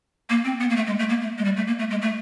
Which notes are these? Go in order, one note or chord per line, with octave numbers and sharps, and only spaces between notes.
A#3
C4
B3
A#3
A3
G#3
A3
A#3
A3
G#3
G3
A3
A#3
A3
G#3
A3